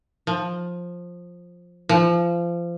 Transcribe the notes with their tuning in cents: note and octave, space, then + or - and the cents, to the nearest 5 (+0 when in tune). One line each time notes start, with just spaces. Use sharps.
F3 +10
F3 -25